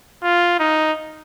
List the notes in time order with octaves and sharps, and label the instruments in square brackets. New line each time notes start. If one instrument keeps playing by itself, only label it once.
[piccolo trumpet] F4
D#4